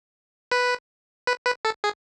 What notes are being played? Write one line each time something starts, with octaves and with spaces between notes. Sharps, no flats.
B4
B4
B4
A4
G#4